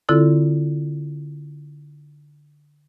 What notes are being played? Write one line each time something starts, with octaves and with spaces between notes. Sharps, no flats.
D3 C4 E4 F4 A4